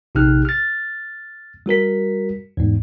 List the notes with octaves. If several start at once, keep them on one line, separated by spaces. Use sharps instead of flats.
A#1 C3 D#4 G4 F6 F#6
F6 A6
G3 F#4 A#4 B6
E2 G#2